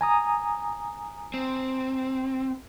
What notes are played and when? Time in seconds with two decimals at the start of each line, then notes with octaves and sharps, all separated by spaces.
0.01 G#5 A#5 D#6
1.34 C4